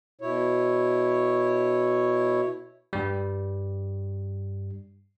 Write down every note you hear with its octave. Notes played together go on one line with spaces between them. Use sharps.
B2 E4 C#5
G2 G3